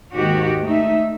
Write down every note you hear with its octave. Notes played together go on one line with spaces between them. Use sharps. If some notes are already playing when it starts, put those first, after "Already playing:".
D#2 G#2 D#3 F#4 G4
A3 D#4 E5